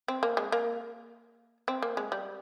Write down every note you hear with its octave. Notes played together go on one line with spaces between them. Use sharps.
C4
A#3
G#3
A#3
C4
A#3
G#3
G3